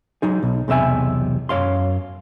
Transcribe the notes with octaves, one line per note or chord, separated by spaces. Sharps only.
F#3 D#4 G#4
B1
B1 E2 C3 E5 G#5
F#2 C#5 F5 C6